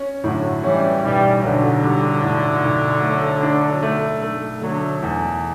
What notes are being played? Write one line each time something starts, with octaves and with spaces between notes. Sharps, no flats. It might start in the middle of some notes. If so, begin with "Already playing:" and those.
Already playing: C#4
A2 D3 F#3
E3 G3 C#4
B1 E3 G3
B1 D3 F#3
G3
A2
B1
A3
D4
A3
A3
D3 F#3 A3
E2